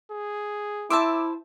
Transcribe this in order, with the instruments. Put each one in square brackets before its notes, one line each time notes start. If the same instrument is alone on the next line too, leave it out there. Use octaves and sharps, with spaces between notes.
[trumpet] G#4
[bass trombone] E4 [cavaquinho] C5 E5 A5 [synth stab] D6 E6